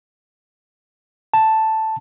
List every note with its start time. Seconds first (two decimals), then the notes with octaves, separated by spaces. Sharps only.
1.34 A5